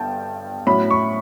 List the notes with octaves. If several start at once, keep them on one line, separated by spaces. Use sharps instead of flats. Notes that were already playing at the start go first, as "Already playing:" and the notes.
Already playing: G1 G2 B3 G5 A5
A2 F#3 C#4 B5
C#6